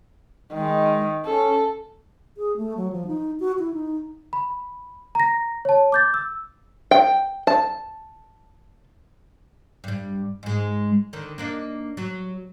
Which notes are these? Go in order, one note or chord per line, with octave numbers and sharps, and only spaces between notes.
D#3 G#3
C#4 A4
G#4
A3
F#3
F3
D#4
F#4
E4
D#4
B5
A#5 A#6
C#5 A5
D6 G6 A6
E6
G5
A5
G2 G3
G#2 G#3
D3 D#3
A#3 D4 D#4
F#3